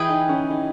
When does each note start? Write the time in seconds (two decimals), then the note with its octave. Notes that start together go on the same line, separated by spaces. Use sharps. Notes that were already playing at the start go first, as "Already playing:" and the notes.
Already playing: E3 E4 G#4 B4 D#5 G5
0.09 D#4
0.29 C#4
0.50 D#4